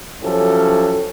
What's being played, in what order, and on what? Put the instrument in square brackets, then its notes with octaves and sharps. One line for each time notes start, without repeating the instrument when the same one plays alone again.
[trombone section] F3 F#3 C#4 E4 G4 A4